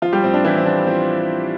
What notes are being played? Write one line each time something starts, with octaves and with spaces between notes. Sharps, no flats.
F3 F4
G3 G4
A2 C4
D4
E3 F3 E4
C4
F3 D4
F3 C4